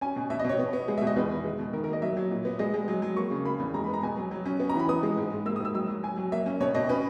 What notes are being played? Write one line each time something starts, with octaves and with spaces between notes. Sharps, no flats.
C#4 G#5
B2
B2 E5
D#5
B2 C#5
B3
B3
G#3
E5
B2
D#5
E2 B4
D#3
G#3
B2
D#3 A#4
A#4
A#3
D#5
F#3 E5
F#3
A#2
B3
G#3 D#5
G#3
F#3
F#3
A#3 C#6
C#3
A#3 B5
E2
G#3 A#5
B5
B3
A#5
B2 G#5
F#3
F#3
C#4
B3
A#5
E3 B5
B3 D#6
G#3
G#2
G#2
A#3 E6
D#6
G#2 E6
F#3 E6
F#3
F#3 G#5
F#3
A#3 E5
C#4
B2 C#5
B2 D#5
C#4 B4